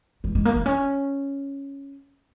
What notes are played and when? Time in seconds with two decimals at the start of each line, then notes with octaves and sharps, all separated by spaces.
0.24 G#3
0.35 G#3
0.45 A#3
0.56 B3
0.66 C#4